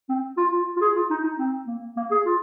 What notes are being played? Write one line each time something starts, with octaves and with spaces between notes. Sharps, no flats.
C4
F4
F4
F4
G#4
F4
D#4
D#4
C4
A#3
A#3
G#4
F4